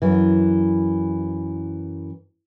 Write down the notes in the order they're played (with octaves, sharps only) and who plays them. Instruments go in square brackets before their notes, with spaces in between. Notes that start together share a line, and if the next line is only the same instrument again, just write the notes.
[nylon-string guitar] F#2 E3